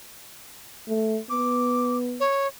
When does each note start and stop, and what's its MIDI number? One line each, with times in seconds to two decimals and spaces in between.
0.88 1.19 57
1.30 2.22 59
1.30 1.98 86
2.20 2.48 73